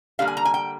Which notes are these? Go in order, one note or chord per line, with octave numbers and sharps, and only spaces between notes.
D3 G3 A#3 F5
G#5
A#5
G#5
G5